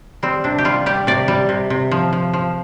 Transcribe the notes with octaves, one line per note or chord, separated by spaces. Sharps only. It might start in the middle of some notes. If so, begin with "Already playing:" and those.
G3 C4
C3 D4
G4
G3 F4
G3 G4
C3 D5
G3
C3
C3
F3
F3
F3